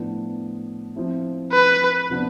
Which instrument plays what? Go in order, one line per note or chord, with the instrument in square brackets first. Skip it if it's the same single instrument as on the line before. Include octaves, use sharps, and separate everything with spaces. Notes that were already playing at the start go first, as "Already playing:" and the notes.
Already playing: [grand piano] A2 F3 B3 D4
F3 C4 E4
[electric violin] B4
[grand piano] C3 F3 B3 D4